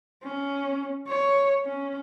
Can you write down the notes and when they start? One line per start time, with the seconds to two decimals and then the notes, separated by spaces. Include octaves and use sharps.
0.23 C#4
1.08 C#5
1.65 C#4